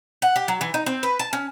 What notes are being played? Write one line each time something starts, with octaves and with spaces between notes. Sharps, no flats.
F#5
G4
F#3
E3
D#4
C4
B4
A5
C#4